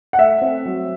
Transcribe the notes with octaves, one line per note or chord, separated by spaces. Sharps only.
F#5
A3 E5
C4
F#3